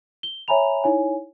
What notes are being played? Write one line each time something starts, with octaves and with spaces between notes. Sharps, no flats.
G7
C#5 E5 G#5 A#5 B5 F7
D#4 E4 C#5 G#5